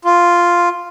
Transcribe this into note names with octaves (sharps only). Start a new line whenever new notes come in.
F4